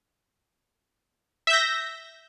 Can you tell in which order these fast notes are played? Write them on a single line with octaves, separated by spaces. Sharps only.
E5 G6 A#6